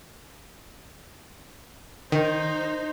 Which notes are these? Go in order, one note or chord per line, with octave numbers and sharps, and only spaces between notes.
D#3 D#4 C5